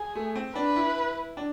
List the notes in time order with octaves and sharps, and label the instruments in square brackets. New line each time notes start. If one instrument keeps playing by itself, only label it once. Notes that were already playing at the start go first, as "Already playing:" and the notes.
Already playing: [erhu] G#4
[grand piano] A3
C4
[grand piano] D4 [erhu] B4
[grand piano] E4
D4